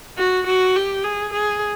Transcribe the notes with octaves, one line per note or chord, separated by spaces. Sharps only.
F#4
F#4
G4
G#4
G#4